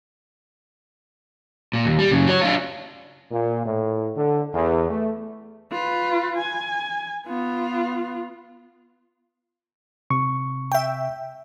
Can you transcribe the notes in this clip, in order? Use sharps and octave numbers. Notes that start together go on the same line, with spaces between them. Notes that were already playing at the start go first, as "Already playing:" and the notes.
A#2
D#2
G3
F#2 C#3
F#4 C#5
D4 F4
A#2
A2
D3
E2
A3
F4 B4
G#5
B3 F4
C3 C#6
E5 G5